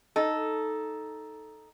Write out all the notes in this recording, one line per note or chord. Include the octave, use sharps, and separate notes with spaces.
D#4 A4